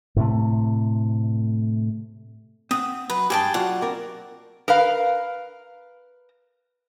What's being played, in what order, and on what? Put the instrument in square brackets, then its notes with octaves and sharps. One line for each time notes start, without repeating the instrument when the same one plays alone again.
[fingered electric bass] A2 C3 A3
[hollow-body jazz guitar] C4 F#5 [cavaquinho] D#6
[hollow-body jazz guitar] F#3 [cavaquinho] B4
[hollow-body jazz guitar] G2 G4 [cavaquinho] G#4 G5 A5
[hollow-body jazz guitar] F#3 F4 D5 [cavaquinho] F#5
[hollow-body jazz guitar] C4 A#4 D5
[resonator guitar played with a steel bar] A#4 B4 F5